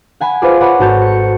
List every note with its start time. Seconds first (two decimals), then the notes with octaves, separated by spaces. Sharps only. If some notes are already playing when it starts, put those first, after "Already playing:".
0.21 F#5 G#5 B5
0.42 F4 G#4 B4 C5 D5
0.60 B4 C#5 D5 F#5 B5 C6
0.79 G#1 F#4 A4 C#5 G6 A6
1.02 C#7